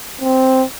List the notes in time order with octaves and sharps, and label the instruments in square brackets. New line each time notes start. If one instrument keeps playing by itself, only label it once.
[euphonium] C4